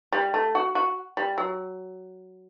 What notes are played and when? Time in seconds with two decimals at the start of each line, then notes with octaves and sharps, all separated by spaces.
0.13 G3
0.34 A3
0.55 F#4
0.75 F#4
1.17 G3
1.38 F#3